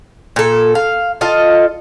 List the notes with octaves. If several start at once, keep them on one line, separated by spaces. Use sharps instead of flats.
A#2 A4
F5
F4 A4 D#5